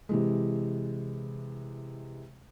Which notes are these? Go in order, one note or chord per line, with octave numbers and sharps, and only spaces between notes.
C3 E3 G#3